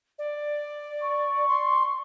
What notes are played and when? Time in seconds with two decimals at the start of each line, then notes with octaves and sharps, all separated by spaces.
0.18 D5
1.01 C#6
1.48 C6